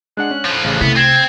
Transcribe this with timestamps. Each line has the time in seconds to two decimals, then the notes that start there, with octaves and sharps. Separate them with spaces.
0.17 G#3 D4 F#5 F#6
0.31 C#4
0.45 A2 F3
0.64 A1 C#3 A6
0.81 C3 A3 B3 E4
0.96 C4 G#6 C7